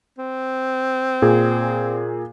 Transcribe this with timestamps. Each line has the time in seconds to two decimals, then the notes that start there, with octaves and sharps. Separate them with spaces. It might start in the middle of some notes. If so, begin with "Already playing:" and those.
0.19 C4
1.22 A#2 G#4